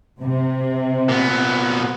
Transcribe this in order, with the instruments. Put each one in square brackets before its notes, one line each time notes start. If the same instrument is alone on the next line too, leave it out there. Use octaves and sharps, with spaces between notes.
[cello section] C3
[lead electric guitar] A#2 B3